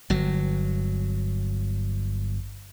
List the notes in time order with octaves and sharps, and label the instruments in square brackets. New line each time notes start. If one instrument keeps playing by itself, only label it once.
[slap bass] G1 F#3